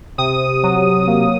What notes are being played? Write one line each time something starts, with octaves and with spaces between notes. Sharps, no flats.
C3 D#6
F#3
A#3